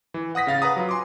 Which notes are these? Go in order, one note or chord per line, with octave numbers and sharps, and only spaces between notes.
E3
F#5 D#6 A#6 B6
C#3 F5 A6
B4 F#5 A#5 D#6
F#3 F4
G#5 C6 D6